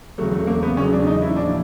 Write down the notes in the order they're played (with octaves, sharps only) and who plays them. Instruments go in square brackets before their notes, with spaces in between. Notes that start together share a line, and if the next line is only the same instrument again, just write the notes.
[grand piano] E2 C#3 F#3 A3
A3
A#3
B3
E2 C#3 F#3 C#4
D4
D#4
E4
A#2 F3 D4